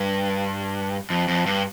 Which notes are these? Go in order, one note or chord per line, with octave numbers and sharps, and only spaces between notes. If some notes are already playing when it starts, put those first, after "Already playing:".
Already playing: G2
F2
F2
G2